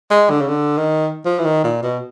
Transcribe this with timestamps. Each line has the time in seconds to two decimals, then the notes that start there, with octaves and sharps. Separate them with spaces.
0.11 G#3
0.30 D3
0.41 C#3
0.49 D3
0.78 D#3
1.25 F3
1.39 E3
1.45 D#3
1.64 A#2
1.83 B2